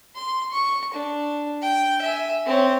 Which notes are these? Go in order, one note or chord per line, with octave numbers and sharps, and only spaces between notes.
C6
C#6
D4
G5
E5 G#5
C4 C#5